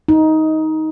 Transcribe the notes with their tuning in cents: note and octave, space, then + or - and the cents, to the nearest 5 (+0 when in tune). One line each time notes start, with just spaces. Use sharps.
D#4 +15